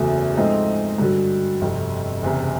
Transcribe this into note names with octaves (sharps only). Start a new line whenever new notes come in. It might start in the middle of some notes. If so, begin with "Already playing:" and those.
Already playing: F#1 E2 C#3 F#3 A3
G#2 F3 A3 C4 D#4
G2 D3 F#3
G1 F2 C3
F#1 E2 C3